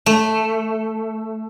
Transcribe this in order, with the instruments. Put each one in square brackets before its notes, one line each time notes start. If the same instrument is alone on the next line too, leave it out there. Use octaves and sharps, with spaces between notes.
[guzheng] A3